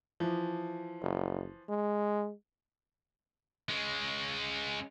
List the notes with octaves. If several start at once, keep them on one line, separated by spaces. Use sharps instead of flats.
E3 F3
F#1
G#3
G#3 C#4